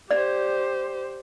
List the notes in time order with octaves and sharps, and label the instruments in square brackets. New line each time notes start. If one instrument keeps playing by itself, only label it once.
[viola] G4 C5 [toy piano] D5